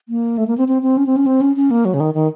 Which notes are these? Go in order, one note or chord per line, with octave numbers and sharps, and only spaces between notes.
A#3
A3
A#3
C4
C4
C4
C#4
C4
C#4
C4
C#4
C#4
A#3
F#3
C#3
D#3
D#3